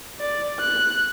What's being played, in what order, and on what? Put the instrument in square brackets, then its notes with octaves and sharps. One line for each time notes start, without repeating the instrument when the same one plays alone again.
[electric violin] D5
F#6